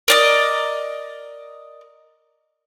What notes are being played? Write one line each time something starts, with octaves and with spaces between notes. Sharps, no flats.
A#4 D5 D#5